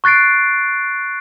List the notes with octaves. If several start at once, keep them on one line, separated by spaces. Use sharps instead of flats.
C#6 F#6 A6 C7 D7